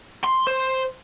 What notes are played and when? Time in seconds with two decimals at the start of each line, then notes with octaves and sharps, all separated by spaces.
0.24 C6
0.47 C5